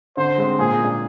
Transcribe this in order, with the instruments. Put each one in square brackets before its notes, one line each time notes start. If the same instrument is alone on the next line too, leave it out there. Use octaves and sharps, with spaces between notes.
[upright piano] D3 [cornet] C5
[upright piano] G#3 C4
[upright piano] A#2 [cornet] G#4
[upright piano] G#3 D4